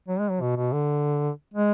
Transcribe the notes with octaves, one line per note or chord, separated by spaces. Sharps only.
F#3
G#3
F#3
B2
B2
D3
G#3